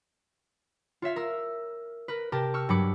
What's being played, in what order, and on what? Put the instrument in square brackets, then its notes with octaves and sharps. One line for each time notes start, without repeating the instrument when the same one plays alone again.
[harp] F4 C#5 E5 F5
A#4 E6
A#4 B4
C3 G4 A#4 A5
C#6 E6 F6
G2 F#3 C#5 B5 D6 C#7